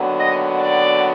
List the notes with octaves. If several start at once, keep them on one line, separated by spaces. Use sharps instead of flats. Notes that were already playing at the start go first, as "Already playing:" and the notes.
Already playing: D#2 D3 F#3 B3
D#5
D5